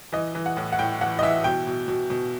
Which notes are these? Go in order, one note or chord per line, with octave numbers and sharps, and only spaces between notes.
E3 D#5
E3
F#5
A2
F#5
A2 G5
E3 F#5
D#5
E3 E5
B2 G5
B2
B2
B2